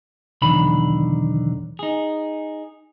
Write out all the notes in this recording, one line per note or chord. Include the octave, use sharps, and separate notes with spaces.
B1 E2 D3 D#3 B5
D#4 G#4